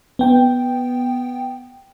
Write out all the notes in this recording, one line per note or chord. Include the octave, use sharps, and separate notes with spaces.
B3 G5